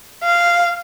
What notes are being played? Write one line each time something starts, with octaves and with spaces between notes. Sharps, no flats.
F5